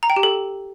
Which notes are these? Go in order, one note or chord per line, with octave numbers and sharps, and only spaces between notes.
A#5
G5
G4
A4